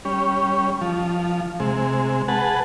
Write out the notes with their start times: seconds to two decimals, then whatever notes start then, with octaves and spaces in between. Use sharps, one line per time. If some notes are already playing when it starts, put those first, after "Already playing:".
0.05 G3 C#4
0.81 F3
1.60 C3 G#3
2.28 G#4 B4 F#5 A5